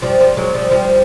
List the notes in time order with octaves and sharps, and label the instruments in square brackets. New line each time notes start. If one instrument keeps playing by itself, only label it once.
[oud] F3 G3
F3 G3
F#3 G#3
F3 G3
F3 G3